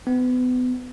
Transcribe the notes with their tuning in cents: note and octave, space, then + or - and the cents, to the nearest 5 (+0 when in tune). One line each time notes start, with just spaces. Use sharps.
B3 +30